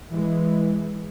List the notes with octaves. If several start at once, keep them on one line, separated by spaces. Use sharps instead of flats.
E3 G#3